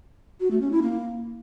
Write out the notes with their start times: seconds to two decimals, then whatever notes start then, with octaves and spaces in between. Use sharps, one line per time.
0.40 F#4
0.51 A3
0.61 C#4
0.72 E4
0.82 A#3